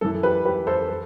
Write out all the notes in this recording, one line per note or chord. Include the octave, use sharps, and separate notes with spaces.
F#2 E3 A4
G4 B4
G4 B4
A4 C5
A4 C5